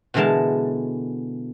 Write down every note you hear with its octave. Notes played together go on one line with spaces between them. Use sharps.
B2 D3 E3 G#3 A#4 A5